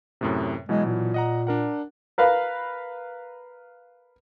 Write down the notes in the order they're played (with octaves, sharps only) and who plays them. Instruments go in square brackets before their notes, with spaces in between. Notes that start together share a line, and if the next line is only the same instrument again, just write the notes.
[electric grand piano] F#2 A2 C3
[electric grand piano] B2 E3 F#3 [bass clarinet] G#3
[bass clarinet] A#2
[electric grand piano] D#5 F#5 A#5
D4 A#4 F#5
[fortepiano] A#4 B4 F5 B5